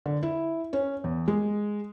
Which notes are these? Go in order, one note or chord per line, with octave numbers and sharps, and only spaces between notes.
D3
E4
C#4
E2
G#3